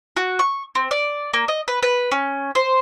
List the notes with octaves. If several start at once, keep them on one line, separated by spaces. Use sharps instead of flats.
F#4
C#6
C4
D5
A#3
D#5
B4
B4
C#4
C5